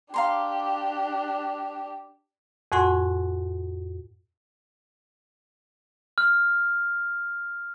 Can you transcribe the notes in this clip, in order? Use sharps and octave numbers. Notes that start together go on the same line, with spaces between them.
D4 G4 F5 A#5 C6
F2 A2 F#4 F#5 G#5 C6
F6